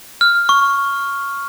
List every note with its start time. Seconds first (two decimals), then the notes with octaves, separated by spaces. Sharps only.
0.21 F6
0.49 C#6